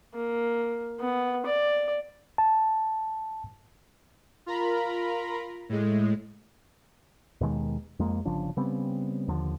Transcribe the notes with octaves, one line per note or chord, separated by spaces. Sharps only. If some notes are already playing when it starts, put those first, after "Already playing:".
A#3
B3
D5
A5
F4 A#4 A#5 B5
A2 G#3
D#2 B2 D#3 G#3
F2 G#3 A#3
G1 C#3 F3 D4
C#3 G3 B3 C4
D#2 D3 F3